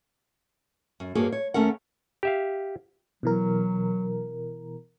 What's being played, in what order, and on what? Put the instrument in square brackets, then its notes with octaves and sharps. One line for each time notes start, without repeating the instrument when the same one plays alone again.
[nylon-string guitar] F#2
G2 A#3 F#4 G#4 C#5
C#5
D#2 A3 C#4 A#4 F#5
[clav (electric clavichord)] G4 E5 F5
[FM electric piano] B2 E3 A#4 [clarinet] F#3